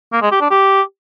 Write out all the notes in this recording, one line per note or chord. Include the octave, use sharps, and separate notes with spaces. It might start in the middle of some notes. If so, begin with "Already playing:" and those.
A#3
G#3
G4
D4
G4